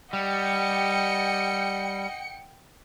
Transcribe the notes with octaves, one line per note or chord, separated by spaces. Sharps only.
G3 D#5 F#5 G5 C#7